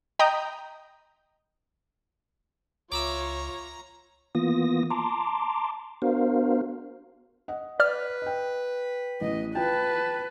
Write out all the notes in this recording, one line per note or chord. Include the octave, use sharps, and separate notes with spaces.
D#5 G5 A#5 B5 D#6 G6
C#2 F4 C#5 E5 A#5 B5 D6
E3 A#3 B3 F4 D#6 A#6
A5 A#5 C6 D6
B3 D4 F#4 A#4 C5 F5
D#5 F#5
B4 D5 F6
D#5 G5
A1 D#5
F4 B4 G5 A5